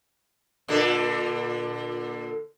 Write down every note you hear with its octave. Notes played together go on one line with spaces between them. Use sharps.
A#2 D3 A4